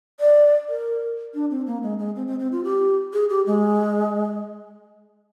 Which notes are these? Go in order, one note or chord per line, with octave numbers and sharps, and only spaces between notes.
D5
A#4
D4
C4
A#3
G#3
G#3
C4
C4
C4
F4
G4
G#4
G4
G#3